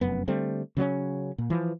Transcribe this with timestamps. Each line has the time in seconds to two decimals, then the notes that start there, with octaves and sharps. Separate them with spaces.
0.01 F1 F#2 B3
0.28 D3 G3 A3 C4
0.77 C#3 F#3 C4 C#4
1.38 A#2
1.50 E3 F3